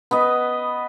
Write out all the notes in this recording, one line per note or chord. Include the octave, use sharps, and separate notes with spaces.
B3 B4 D#5